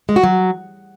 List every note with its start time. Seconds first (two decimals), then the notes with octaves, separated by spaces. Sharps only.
0.09 G#3
0.16 F#4
0.24 F#3